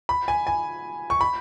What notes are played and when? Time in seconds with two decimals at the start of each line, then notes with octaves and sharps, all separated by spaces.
0.09 B5
0.28 G#5
0.47 G#5
1.10 C#6
1.21 B5